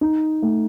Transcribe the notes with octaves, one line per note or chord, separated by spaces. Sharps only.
D#4
A3